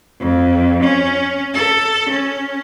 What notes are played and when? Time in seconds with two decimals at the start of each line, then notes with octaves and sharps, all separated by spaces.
0.20 F2
0.83 C#4
1.54 A4
2.09 C#4